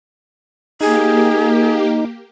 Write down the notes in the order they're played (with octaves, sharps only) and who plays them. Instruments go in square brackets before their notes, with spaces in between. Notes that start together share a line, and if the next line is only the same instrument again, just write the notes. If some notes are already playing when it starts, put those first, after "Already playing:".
[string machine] A#3 G4 [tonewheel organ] D#4 [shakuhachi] G#4